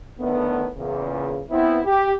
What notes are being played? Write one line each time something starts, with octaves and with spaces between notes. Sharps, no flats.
A2 D3 D#3 A3 B3
E2 A#2 C#3
B3 C4 E4
G4